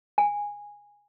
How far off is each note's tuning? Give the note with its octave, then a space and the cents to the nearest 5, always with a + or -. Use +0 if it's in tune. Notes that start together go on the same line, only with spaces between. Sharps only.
G#5 -15